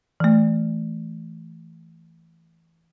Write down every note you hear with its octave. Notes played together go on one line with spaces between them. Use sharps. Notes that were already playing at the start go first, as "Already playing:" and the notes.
E3 A3